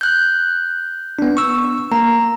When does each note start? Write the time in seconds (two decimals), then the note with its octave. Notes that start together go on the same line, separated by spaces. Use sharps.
0.01 F#6 G6
1.19 B3 D4
1.37 C#6 E6
1.92 A#3 A#5